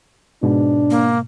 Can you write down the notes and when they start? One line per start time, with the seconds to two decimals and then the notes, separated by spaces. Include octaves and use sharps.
0.43 G#2 B2 D4
0.91 A#3